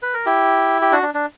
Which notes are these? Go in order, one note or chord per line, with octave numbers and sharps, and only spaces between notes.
B4
A#4
E4 G4
G4
D4 F#4
D4
D4